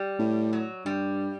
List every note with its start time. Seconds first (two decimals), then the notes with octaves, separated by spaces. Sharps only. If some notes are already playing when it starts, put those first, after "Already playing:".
Already playing: G3
0.19 A2
0.53 F#3
0.85 G2 G3